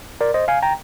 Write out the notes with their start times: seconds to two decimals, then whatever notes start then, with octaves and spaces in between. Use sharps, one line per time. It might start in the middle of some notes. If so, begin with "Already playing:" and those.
0.21 A#4 D5
0.34 C5 D#5
0.48 F5 G#5
0.63 G5 A#5